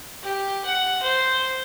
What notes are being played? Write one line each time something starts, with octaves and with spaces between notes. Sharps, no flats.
G4
F#5
C5